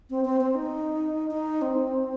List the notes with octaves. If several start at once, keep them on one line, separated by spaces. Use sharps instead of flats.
C4
C4
C4
D#4
D#4
C4